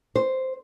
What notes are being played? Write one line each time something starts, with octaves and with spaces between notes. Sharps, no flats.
C5